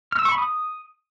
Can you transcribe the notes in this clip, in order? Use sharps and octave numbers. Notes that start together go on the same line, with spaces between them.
F6
E6
C#6
B5
D#6